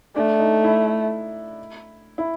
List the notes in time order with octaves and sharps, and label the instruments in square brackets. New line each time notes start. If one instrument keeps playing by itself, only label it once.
[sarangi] A3 [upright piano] D4
[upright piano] D#4
E4
E4